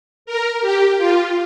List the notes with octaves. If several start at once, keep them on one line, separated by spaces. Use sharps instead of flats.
A#4
G4
F4